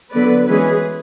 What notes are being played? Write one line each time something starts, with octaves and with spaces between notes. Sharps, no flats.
D3 F#3 B3 B4 D5
E3 G#3 C#4 G#4 B4